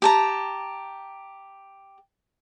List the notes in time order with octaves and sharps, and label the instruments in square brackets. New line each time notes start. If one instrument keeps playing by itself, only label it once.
[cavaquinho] G4 A5 A#5